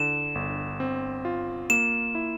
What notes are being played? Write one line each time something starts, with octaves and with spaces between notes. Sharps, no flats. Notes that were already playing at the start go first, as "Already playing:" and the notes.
Already playing: D3 E4 E7
G1
C4
F4
A#3 E7
E4